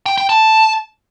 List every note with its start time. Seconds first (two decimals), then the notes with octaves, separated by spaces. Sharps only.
0.06 G5
0.18 G5
0.29 A5